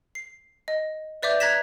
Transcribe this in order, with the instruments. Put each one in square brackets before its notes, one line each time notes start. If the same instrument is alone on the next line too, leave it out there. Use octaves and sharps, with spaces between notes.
[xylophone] C7
D#5
B4 D5 E5 D6 G6
A#5 F#6 G#6 A#6 B6 E7